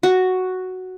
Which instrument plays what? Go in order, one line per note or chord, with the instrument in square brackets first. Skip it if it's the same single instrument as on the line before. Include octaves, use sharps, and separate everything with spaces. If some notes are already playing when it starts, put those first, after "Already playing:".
[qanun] F#4